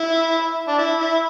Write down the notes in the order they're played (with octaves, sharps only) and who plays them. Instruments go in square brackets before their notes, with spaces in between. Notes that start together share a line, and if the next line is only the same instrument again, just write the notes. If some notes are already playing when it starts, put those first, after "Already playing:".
Already playing: [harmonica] E4
D4
E4
E4